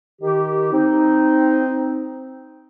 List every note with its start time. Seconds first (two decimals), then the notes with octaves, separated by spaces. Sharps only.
0.21 D#3 G4
0.72 C4 D#4